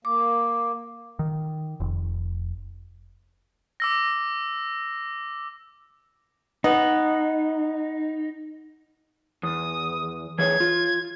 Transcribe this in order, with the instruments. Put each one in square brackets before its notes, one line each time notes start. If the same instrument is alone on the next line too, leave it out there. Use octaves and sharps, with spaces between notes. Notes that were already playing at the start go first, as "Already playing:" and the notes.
[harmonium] A#3 [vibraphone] D6
[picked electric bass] D#3
F1
[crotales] D6 E6 A#6
[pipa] B3 [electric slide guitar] D#4
[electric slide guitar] E2 [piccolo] D#6
[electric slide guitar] E3 G#4 C#5 [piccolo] G#6
[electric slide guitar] F4